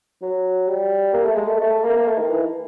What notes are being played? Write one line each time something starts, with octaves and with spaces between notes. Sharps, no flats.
F#3
G3
A#3
A3
G#3
A3
A3
A#3
A#3
A3
D#3
E3